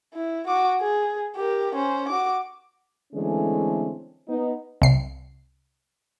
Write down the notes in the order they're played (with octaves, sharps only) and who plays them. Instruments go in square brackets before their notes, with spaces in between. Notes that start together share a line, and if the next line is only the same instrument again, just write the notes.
[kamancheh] E4
F#4 D6
G#4
G4 A#4
C#4 C5
F#4 D6
[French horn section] D3 E3 G#3 A3 C4 C#4
B3 D#4
[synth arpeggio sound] C2 C7